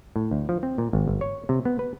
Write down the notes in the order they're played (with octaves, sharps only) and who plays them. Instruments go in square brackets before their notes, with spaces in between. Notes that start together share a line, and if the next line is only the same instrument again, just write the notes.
[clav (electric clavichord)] A2
D2
F3
C4
A#2
G#1
G1
C#5
C3
B3
B4